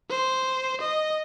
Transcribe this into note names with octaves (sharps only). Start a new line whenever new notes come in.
C5
D#5